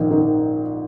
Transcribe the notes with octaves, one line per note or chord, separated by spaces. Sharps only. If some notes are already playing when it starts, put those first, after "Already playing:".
Already playing: A#1 G#2 D#3
D#3